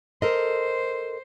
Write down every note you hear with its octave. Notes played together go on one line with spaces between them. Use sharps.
A4 A#4 C5 D#5